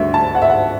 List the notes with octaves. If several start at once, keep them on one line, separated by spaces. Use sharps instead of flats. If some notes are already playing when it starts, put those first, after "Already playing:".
Already playing: D2 D3 G3 F#4 E5
A5
F#5
E5
F#5